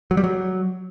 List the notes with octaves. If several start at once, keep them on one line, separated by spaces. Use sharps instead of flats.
F#3
G3
F#3